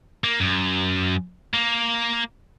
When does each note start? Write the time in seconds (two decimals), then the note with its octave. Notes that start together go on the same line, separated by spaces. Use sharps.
0.24 A#3
0.40 F#2
1.54 A#3